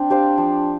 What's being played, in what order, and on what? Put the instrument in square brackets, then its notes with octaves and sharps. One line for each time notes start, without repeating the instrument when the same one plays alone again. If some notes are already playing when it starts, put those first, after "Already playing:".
Already playing: [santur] C4 [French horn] D4
[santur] G4 C5 F5
F3